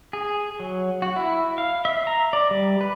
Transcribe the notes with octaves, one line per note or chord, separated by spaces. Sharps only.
G#4
F#3
F#4
E4
F5
E5
A#5
D5
G3
B4